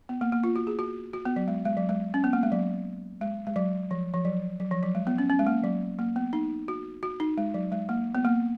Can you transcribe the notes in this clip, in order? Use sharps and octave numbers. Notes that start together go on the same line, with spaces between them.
B3
A#3
A#3
F4
F#4
G#4
F#4
F#4
B3
F#3
G#3
G#3
F#3
G#3
C#4
B3
A#3
G#3
F#3
G#3
G#3
F#3
F3
F3
F#3
F#3
F3
F#3
G#3
B3
C#4
C#4
G#3
A#3
F#3
A#3
B3
D#4
F#4
F#4
D#4
G#3
F#3
G#3
A#3
B3
A#3